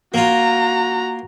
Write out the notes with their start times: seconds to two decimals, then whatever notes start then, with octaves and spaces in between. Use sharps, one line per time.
0.14 A#3 F4 F#4 A#5